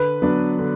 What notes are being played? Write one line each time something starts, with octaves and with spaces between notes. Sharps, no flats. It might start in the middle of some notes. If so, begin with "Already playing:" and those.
Already playing: D3 B4
F#3 B3 D4
D3